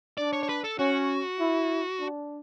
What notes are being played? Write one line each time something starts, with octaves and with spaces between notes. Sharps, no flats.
D4 D5
C#5
C#5
B4
A4
C#4 F#4
E4
D4